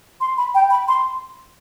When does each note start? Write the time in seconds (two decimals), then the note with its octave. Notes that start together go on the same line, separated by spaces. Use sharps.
0.21 C6
0.38 B5
0.55 G5
0.70 B5
0.88 C6